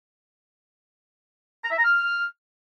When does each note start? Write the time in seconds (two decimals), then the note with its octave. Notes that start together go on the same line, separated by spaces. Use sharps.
1.64 A#5
1.71 E5
1.78 A#5
1.85 F6